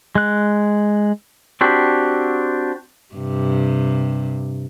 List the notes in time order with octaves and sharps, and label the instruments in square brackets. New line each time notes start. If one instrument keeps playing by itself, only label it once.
[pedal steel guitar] G#3 F#6
[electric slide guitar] C4 D4 F#4 G4
[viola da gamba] G2 C3